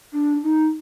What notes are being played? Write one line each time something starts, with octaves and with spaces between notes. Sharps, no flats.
D4
D#4